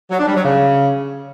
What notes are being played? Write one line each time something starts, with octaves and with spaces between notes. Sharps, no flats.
F#3
D4
G3
F#3
C#3